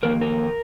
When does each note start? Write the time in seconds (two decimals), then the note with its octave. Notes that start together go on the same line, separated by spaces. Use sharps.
0.03 F2 D#3 A#3 A#4
0.21 A#4